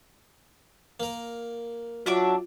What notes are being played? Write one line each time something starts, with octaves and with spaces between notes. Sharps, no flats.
A#3 A#4
F#3 D4 F4 E5 D6